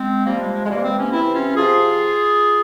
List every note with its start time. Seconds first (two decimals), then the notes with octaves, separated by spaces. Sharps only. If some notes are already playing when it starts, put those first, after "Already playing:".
Already playing: G#3 C4
0.25 C3 F3 G3 A#3
0.40 G#3
0.54 G#3
0.64 G#3
0.68 C3 E3 G3 A#3
0.83 G#3 C4
0.98 A#3 C#4
1.12 C3 E3 C4 E4
1.34 C#4 F4
1.55 C3 F3 F4 G#4